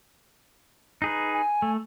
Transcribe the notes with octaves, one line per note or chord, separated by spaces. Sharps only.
D#4 G#4 B4 A#5
G#5
A3